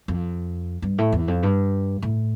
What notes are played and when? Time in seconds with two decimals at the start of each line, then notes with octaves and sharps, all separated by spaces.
0.08 F2
0.82 G2
0.98 A2
1.12 E2
1.28 F2
1.43 G2
2.02 A2